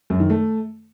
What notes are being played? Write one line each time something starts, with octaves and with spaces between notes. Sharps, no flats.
F#2
D#3
A3